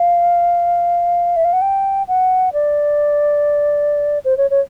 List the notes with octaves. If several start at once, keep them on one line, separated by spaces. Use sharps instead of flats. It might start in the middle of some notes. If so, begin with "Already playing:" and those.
Already playing: F5
E5
F5
F#5
G5
F#5
D5
C5
C#5
C#5